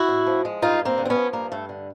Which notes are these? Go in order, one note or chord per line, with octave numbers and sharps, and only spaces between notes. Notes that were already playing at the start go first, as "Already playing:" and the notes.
Already playing: E4 F#4
A2
F3
G#3
G2 D#4 F4
G2
A#3 C4
D3
C4
B3 C#4
F3
G2 A#3
G2 A3
D3